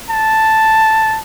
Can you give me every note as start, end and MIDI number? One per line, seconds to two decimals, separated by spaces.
0.11 1.19 81